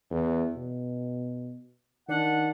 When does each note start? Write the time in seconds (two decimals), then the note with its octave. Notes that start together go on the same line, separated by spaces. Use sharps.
0.10 E2
0.56 B2
2.08 D#3 D4 F#5